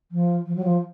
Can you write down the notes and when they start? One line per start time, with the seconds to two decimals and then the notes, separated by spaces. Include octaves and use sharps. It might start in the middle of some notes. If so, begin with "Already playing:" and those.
0.11 F3
0.46 F3
0.56 F#3
0.64 F3